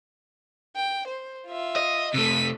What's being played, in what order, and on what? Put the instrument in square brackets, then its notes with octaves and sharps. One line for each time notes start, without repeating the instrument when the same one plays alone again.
[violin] G5
C5
F4 E5
[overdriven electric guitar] D#5
[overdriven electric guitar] C3 A3 [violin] B6 D#7